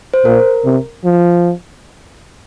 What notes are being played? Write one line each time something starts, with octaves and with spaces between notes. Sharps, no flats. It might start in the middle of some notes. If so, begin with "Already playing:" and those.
C5
A#2 A#4
C3
F3